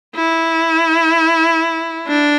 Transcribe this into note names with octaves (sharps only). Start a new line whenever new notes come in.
E4
D4